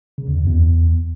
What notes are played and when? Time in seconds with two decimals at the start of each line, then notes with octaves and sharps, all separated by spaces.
0.18 C#3
0.28 E2
0.38 F#2
0.48 E2